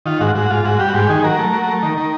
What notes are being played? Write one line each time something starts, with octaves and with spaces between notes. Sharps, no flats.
D#3 F4
G#2 F#4
G#2 F#4
G#2 F4
G#2 F#4
G3 G4
F#4
G#2 G4
D#3 G#4
F#3 A#4
A3
F#3
A3
D#3
D#3